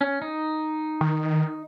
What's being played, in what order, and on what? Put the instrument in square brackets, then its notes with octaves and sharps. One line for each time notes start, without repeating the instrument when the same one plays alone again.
[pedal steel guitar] C#4
D#4
[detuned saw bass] D#3